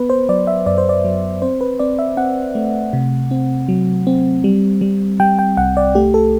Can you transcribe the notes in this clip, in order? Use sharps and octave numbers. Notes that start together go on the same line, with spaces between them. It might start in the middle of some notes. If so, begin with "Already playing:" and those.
Already playing: B3 B4
C5
F#3 D5
E5
F#2 D5
C5
D5
F#3
C4 C5
B4
C4 D5
E5
C4 F#5
A3
C3
C4
F#3
C4
G3
G3
G3 G5
G5
C2 F#5
D5
A3 G4
A4